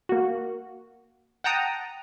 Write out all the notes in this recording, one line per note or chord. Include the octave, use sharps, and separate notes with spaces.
A#3 F#4
F#5 G5 A5 A#5 D#6